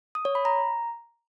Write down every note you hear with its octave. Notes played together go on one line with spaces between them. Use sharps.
D#6
C#5
B5
A#5